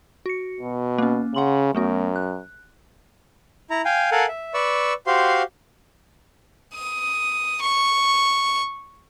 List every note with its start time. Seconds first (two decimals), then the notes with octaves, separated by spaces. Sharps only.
0.26 F#4 C#7
0.60 B2
0.98 A#3 C#4
1.35 C#3 F#5 C6 F#7
1.75 F#2 A3 B3 F#4
2.16 F#6
3.70 E4 A#5
3.85 F5 G5 G#5
4.11 A4 A#4 F5 F#5 G#5
4.28 E5
4.54 B4 D5 C#6 E6
5.07 F#4 G4 C5 F5 C6
6.74 D#6
7.61 C#6